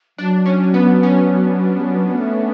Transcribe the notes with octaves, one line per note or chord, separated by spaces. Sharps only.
F#3 D4
C#4
B3
C#4
G3
F#3
B3
A3